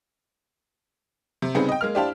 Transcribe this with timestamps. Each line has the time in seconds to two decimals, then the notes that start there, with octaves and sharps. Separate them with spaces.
1.42 C3
1.55 C#3 G3 B3 C4 D#4 G#4
1.69 D#5 G5
1.81 G#3 A#3 F6
1.95 D4 E4 G4 C5 F5 A5